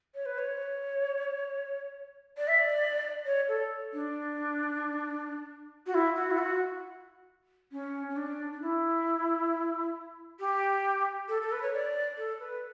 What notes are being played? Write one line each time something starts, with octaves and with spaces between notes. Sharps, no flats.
C#5
B4
C#5
D5
E5
D5
C#5
A4
D4
F#4
E4
F#4
E4
F#4
C#4
C#4
D4
D4
E4
G4
A4
A4
B4
C#5
D5
A4
B4